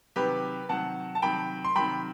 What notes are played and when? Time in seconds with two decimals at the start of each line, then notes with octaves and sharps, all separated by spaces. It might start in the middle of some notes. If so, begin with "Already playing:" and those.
0.16 C3 D#3 F#3 G4 B4
0.69 C3 D#3 F#3 F#5 A5
1.15 A5
1.22 C3 D#3 F#3 G5 B5
1.64 C6
1.75 C3 D#3 F#3 G5 B5